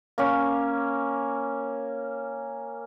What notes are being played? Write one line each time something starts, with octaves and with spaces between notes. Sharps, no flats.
A#3 C#4